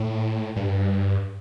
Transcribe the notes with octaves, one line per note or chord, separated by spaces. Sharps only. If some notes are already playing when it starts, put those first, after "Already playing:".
Already playing: A2
G2